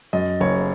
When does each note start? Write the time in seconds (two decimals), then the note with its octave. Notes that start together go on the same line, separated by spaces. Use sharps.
0.13 F#2 D#5
0.40 F#1 C#5